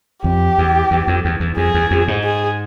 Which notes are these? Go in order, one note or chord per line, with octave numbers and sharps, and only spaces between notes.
F2 G4
E2
E2
F2
E2
E2
F2 G#4
E2
F2
G#2
G#4